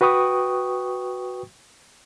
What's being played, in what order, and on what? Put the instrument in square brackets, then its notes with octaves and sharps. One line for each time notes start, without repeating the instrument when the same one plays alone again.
[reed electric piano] F#4 B4 G5 C#6 D#6